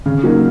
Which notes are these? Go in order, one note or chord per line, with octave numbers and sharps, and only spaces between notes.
C#3
F#3 A#3 D#4